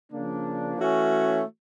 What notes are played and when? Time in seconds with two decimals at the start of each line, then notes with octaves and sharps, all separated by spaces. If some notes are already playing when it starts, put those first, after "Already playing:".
0.12 C#3 F3 A#3 D4
0.77 E3 A3 C#4 F#4